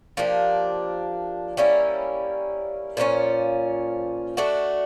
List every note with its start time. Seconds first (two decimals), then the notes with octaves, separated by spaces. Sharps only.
0.17 F3 A#3 D4 G4
1.57 G3 A#3 C#4 E4
2.97 A#2 F3 A3 C#4
4.37 A3 D4 F#4